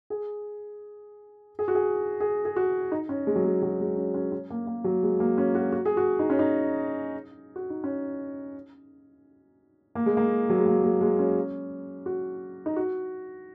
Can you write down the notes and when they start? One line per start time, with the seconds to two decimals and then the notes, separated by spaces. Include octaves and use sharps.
0.10 G#4
1.59 G#4
1.68 F#4
1.75 G#4
2.20 G#4
2.45 G#4
2.56 F#4
2.92 D#4
3.09 C#4
3.27 G#3
3.36 F#3
3.44 G#3
3.62 F#3
3.80 G#3
3.97 C#4
4.14 C#4
4.32 C#4
4.50 A#3
4.67 A#3
4.84 F#3
5.03 G#3
5.20 A#3
5.38 C#4
5.55 F#4
5.72 F#4
5.85 G#4
5.97 F#4
6.19 D#4
6.30 C#4
6.39 D#4
7.56 F#4
7.70 D#4
7.84 C#4
9.95 A#3
10.06 G#3
10.17 A#3
10.50 F#3
10.58 G#3
10.66 A#3
10.83 G#3
11.01 G#3
11.19 C#4
12.06 F#4
12.66 D#4
12.76 F#4